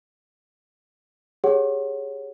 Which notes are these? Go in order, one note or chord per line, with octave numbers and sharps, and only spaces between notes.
G4 G#4 C#5 F#5